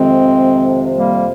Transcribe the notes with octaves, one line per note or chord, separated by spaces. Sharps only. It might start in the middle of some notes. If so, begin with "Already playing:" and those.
Already playing: F2 C3 D#3 G#3 C4
G3 A#3